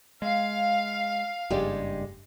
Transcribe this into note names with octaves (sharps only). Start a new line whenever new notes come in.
G#3 F5
F#1 G2 G#3 G4 D5